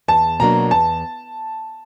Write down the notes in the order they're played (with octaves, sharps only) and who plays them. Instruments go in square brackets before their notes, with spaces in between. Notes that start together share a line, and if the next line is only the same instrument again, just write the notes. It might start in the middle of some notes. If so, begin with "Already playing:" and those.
[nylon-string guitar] E2 [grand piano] A5
[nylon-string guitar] B2 F#3 A#3 D4 [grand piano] A#5
[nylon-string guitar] E2 [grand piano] A5